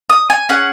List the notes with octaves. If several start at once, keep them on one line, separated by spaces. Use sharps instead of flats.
D#6
G#5
C#4 G#4 F#5